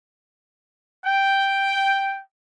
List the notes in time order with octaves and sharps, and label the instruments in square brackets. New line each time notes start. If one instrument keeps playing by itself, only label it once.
[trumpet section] G5